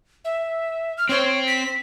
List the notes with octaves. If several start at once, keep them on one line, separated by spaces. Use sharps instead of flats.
E5
F6
C4 C5 C#5
B6